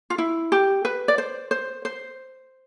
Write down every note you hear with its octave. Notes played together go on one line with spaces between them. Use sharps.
F4
E4
G4
B4
D5
C5
C5
C5